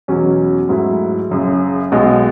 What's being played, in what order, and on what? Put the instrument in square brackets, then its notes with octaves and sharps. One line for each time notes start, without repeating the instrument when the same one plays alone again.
[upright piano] E2 B2 F#3 C#4
G#2 F#3 A3 E4
F#1 F#2 C#3
B1 B2 G#3